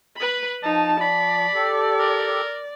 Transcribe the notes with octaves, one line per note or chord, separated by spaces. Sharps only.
B4 B5
F3 D#4 A5
D5 B5
G4 A4
A#4